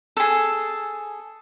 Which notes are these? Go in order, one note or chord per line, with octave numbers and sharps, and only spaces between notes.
G#4 A4